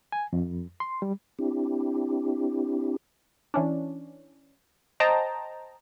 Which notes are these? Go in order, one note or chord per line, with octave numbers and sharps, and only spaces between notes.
G#5
F2
C6
G3
C4 D4 E4 G4
E3 C#4 D4
C5 D#5 G5 A5 A#5